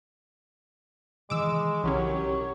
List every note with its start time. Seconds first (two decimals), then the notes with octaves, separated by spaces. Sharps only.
1.30 C3 D#3 E3 G#3 D6 E6
1.84 B1 C#3 E3 F#3 C#4 G4 A#4 C#5